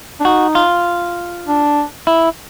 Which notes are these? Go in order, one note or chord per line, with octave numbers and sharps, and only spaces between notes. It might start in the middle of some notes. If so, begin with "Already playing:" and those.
D4
D#4 F#4
F4
D4
E4